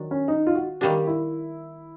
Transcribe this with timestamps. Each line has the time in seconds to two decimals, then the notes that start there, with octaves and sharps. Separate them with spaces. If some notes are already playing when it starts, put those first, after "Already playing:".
Already playing: D#3 F#3 D4
0.11 C#4
0.28 D#4
0.47 F4
0.55 F#4
0.81 D#3 G3 A#3 D4 G4
1.07 E4